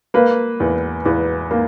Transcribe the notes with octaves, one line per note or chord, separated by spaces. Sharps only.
A#3 B4
E2
E2 B4
A#3